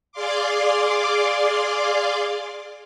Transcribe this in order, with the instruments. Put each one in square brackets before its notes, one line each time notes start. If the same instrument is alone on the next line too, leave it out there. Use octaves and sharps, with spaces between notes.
[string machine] G#4 D5 F5 C6 D6